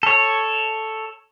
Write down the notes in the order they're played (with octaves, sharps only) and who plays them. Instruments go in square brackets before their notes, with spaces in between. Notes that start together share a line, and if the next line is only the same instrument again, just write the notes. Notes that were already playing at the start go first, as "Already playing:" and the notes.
[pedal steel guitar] A4 C#5